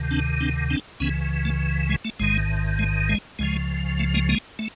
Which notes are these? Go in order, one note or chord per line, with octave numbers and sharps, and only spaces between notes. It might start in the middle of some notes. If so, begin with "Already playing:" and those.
Already playing: D2 C3 D#3
C4 D4
C4 D4
C4 D4
C#2 C#3 E3 B3 C#4
A3
G#3
A3
A1 G#2 D#3 G#3
G#3
G#3
C#2 C#3 F3 G#3
A3
G#3 A#3
G#3 A#3
A3